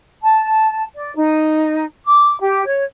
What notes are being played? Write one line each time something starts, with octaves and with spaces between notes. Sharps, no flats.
A5
D5
D#4
D6
G4
C#5